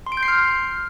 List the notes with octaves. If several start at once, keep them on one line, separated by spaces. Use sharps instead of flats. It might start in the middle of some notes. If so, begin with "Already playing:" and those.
C6
D7
G6
C7
F6